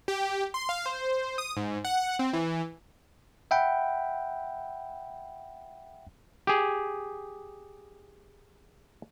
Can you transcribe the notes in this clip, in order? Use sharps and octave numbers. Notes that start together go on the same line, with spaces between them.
G4
C6
F5
C5
D#6
G#2
F#5
C4
E3
E5 F#5 G5 B5
G4 G#4